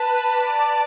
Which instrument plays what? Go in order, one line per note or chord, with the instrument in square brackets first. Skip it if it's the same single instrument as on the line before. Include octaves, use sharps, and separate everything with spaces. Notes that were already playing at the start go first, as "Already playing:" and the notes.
Already playing: [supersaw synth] B4 [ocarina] A5
[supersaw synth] D5